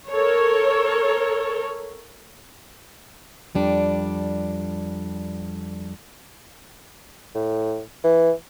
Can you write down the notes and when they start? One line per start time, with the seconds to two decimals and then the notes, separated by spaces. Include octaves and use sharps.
0.11 A4 A#4 C#5
3.55 F2 G3 D4
7.35 A2
8.04 E3